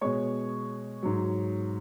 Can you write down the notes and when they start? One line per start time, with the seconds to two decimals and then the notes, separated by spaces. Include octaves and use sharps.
0.01 B2 G#3 C#5 C#6
1.03 G#2 F#3